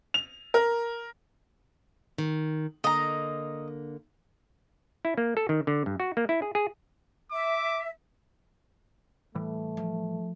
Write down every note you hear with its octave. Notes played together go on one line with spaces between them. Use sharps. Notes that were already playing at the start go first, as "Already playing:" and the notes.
F7
A#4
D#3
D3 A#3 D#5 A#5
E4
A#3
A4
D#3
D3
G2
F#4
A#3
E4
G#4
G#4
E5 D6
A2 E3 G3 A3
F3